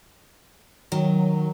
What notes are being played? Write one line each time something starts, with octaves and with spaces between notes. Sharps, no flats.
D#3 F#3